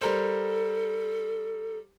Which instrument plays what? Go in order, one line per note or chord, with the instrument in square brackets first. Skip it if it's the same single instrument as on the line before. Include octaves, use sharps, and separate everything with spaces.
[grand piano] G3 A#4 C5 [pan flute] A4